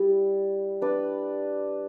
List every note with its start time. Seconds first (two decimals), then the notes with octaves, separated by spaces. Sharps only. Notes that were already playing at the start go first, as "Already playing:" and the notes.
Already playing: G3 E4
0.81 D4 B4 D5